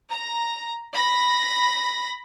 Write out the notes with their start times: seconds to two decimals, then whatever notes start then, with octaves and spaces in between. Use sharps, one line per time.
0.11 A#5
0.95 B5 A#6